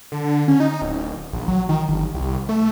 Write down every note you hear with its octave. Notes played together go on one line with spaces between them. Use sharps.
D3
C#4
D#4
D1
A#1
F#3
D#3
G1
C2
A3